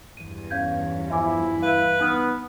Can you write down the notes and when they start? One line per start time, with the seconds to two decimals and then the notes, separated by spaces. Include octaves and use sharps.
0.17 E2 G2 D#7
0.50 C#4 F5 G6 G#6
1.10 F3 E4 E5 G#5 D6
1.62 B4 F5
2.00 B3 D#4 D#6 F6